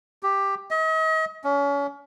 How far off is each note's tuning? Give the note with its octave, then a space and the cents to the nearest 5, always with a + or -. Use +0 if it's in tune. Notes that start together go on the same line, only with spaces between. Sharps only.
G4 +5
D#5 +40
C#4 +30